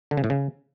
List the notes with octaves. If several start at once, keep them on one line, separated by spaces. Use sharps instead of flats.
D3
C#3
A2
C#3